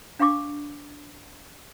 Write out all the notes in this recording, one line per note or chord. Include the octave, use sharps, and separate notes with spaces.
D4 F5 G5 C#6 D6